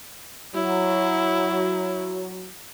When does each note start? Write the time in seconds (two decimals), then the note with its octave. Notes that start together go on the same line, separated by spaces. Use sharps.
0.54 F#3 E4